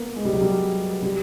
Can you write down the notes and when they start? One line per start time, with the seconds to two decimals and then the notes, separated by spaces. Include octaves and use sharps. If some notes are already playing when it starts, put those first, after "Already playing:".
Already playing: A#3 B3
0.16 G#3
0.25 G3
0.33 F#3
0.42 G3
1.03 G3